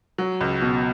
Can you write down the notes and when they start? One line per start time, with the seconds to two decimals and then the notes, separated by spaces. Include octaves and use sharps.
0.18 F#3
0.41 C#2
0.62 B2